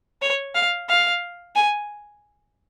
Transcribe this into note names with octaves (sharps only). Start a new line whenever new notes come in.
C#5
F5
F5
G#5